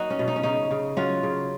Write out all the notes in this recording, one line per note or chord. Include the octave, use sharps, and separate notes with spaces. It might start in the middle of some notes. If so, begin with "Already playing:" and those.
Already playing: F#3 A#3 D#4 F#4
C#4
B2
D#4
C#4
C#3 D#4
C#3
F#3 C#4 F4
C#3